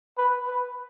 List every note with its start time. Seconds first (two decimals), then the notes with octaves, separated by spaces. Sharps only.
0.17 B4
0.47 B4